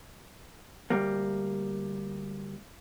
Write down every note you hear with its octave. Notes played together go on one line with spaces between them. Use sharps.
D2 G3 A#3